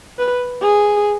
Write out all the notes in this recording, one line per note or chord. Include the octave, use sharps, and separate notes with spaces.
B4
G#4